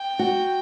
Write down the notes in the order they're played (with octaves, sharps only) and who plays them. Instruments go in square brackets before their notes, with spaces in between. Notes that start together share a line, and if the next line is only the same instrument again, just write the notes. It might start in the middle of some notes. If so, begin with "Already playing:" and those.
Already playing: [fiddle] G5
[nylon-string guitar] F#4